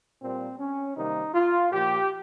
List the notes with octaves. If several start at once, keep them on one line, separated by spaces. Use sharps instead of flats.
A#2 G3 A#3 C4
C#4
C3 D#3 G3 A#3 D#4
F4
A#2 F3 A#3 G4